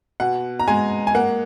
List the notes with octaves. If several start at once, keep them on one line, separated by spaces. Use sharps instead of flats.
B2 F#5
A#5
G#3 G#5
G#5
A#3 F#5